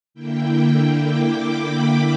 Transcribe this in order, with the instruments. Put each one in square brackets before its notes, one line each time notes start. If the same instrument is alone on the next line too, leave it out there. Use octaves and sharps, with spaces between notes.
[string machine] D3 A#3 E4 G5
D6
B5